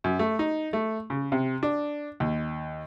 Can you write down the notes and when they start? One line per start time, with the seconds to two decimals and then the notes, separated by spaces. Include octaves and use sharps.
0.04 F#2
0.19 A3
0.39 D#4
0.73 A3
1.10 C#3
1.32 C3
1.63 D4
2.20 D#2